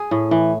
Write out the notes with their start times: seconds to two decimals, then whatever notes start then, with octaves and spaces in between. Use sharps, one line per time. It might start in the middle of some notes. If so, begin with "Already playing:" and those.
Already playing: G#4
0.11 A2
0.31 E3